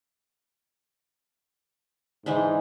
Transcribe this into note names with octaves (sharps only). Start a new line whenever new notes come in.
G#2 E3 G#3 D4